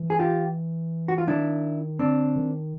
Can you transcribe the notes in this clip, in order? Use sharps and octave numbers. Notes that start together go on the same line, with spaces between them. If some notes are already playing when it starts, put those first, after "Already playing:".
Already playing: E3
G#4
F4 G4
F#4
F4
D#3 D4 E4
D3 C4 D4
D#3